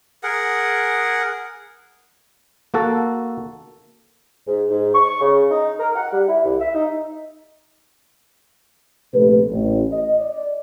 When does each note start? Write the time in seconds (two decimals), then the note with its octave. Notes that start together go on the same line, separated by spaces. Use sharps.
0.23 G#4 A#4 F#5
2.74 A#3 F#4 A4
4.47 G#2
4.70 G#2
4.94 C#6
5.21 C#3
5.50 D#4
5.80 A#4
5.96 F#5
6.12 G3
6.28 E4
6.44 C2
6.59 E5
6.75 D#4
9.14 A#1 C3 A3 B4
9.51 A1
9.92 D#5
10.20 D5